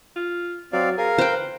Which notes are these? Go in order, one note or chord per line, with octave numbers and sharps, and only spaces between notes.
F4
F#3 C4 D5 F5
G#4 A#4 F5
B4 C5 G5